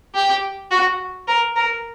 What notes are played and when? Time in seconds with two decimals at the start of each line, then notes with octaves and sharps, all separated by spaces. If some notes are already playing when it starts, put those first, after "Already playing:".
0.14 G4
0.71 F#4
1.28 A#4
1.56 A#4